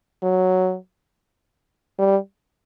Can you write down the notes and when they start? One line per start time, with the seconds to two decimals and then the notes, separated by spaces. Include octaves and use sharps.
0.23 F#3
1.99 G3